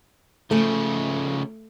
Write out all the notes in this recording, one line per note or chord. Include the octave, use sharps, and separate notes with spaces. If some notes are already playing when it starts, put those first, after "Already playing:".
C#3 F3 A3